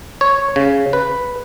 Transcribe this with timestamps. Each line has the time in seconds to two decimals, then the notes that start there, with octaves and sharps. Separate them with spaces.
0.21 C#5
0.56 C#3
0.93 B4